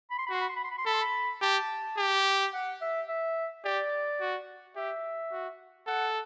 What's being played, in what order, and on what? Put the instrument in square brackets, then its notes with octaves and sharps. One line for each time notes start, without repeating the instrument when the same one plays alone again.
[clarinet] B5
C6
B5
[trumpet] F#4 [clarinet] C6
[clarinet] B5
C6
B5
C6
B5
C6
[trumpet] A4 [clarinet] B5
[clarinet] C6
B5
[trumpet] G4 [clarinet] A5
[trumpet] G4
[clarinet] F#5
E5
E5
[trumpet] G4 [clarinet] D5
[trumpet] F#4
[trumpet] G4 [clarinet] E5
[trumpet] F#4
[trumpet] A4 [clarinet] F#5